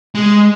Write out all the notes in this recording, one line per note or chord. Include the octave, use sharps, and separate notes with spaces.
G#3